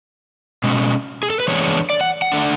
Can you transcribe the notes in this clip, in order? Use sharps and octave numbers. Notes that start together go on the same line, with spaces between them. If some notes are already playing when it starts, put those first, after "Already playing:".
B2 G#3 C#4
G#4
A4
B4
E3 G#3 B3 D4 C#5
D5
F#5
F#5
D3 A3 D4